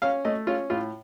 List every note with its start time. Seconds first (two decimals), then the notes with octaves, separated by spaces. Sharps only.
0.02 C#4 F5
0.25 A3 D#5
0.47 C#4 F4
0.70 A2 F4